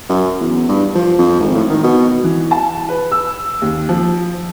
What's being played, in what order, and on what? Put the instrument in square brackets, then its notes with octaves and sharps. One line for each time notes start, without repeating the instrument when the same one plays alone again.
[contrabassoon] F#2
E2
G2
F3
F2
G#1
A2
D#3
B2
[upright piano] E3
A5
B4
E6
D#2
F3